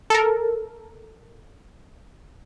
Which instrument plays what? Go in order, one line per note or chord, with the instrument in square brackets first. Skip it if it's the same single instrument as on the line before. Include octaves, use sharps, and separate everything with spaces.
[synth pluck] A4 A#4